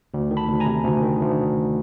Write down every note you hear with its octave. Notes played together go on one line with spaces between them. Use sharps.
D2
D#3
A5 B5
D2
G#5 A#5
C3
D2
D#3
D2